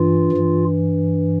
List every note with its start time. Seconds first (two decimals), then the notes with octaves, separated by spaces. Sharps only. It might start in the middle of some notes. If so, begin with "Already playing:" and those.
Already playing: G2 E3 F4
0.32 G2 E3